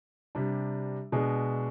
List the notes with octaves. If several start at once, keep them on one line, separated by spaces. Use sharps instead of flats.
C3 G3 D4
B2 G#3 D4